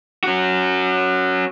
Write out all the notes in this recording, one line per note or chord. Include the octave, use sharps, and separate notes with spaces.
C#4 F#4